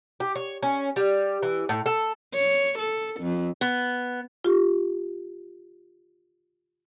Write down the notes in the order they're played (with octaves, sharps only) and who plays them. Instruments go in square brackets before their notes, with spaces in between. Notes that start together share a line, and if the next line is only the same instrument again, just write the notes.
[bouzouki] G4
C#5
C#4
G3
E3
A2
A4
[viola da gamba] C#5
A4
F2
[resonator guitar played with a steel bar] B3
[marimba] F4 G4